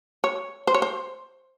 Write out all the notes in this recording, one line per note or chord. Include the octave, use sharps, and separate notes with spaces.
C#5
C5
C#5
C5